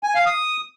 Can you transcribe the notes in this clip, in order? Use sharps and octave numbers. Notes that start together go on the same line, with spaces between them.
G#5
F5
D#6